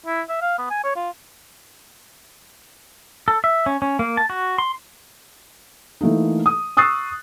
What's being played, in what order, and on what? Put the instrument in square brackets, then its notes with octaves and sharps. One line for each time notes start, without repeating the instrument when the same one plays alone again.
[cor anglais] E4
E5
F5
B3
G#5
C#5
F4
[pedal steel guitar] A4
E5
C#4
C#4
A#3
A5
F#4
C6
[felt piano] E3 A3 A#3 D#4
D#6
C#6 D#6 E6 F#6 A6 C7